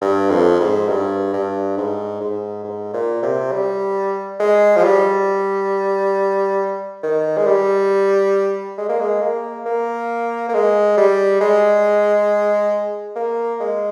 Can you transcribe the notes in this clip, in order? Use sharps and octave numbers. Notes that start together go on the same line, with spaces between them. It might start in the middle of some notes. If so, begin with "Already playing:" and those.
G2
F2
G#2
G2
G2
G#2
G#2
G#2
A#2
C3
G3
G#3
F3
G3
D#3
G#3
G3
G#3
A#3
G#3
A#3
A#3
A#3
G#3
G3
G#3
A#3
G#3